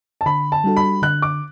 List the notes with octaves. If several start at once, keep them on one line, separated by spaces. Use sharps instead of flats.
A5
D3 B5
A5
G3 D4 F#4 A4
B5
D3 F#6
D6